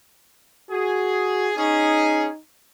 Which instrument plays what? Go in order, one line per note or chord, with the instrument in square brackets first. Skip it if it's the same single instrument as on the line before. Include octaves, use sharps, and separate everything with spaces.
[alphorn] F#4 [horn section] G#4
[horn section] C#4 G#4 [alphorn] D#4